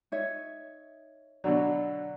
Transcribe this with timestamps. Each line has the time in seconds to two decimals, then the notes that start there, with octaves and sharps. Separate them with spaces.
0.12 D#4 C#5 E5
1.44 B2 D3 F#3 D5